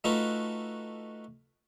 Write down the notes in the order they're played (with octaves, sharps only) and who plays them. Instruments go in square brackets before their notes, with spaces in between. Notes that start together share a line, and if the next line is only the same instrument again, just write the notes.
[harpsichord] A3 D#4 F4 F#4 B4